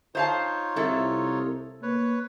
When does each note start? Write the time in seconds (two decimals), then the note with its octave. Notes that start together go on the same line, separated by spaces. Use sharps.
0.15 D#4 F4 C5 C#5 F5 A5
0.76 C2 C3 E4 A4
1.83 A#3 B4 C#5